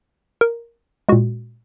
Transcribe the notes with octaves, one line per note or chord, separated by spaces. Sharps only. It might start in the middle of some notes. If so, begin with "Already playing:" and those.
A#4
A#2 G#3 F#4